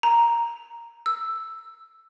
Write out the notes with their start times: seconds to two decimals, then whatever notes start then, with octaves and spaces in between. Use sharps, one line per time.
0.03 A#5
1.06 E6